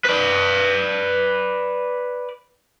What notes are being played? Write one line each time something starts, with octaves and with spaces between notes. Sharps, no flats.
B4 D5